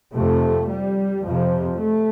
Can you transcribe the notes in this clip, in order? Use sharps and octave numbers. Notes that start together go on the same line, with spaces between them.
F2 C3 A3
G3
F2 C3 F3
A3